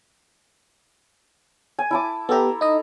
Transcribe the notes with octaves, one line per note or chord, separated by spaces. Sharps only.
G#5
E4 A5 D6
B3 G4 A4 E5 A#5
D#4 D#5